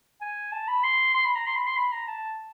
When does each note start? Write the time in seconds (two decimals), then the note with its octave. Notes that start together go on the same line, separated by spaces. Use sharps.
0.21 G#5
0.52 A5
0.68 B5
0.84 C6
1.15 C6
1.25 B5
1.35 A#5
1.46 C6
1.56 B5
1.67 C6
1.77 B5
1.92 A#5
2.08 A5